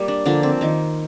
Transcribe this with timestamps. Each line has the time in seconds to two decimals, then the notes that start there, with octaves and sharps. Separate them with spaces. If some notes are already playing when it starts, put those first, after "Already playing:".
Already playing: G3 A#3
0.08 D4
0.26 D3 F3 A#3 D4
0.43 C4
0.61 D#3 A#3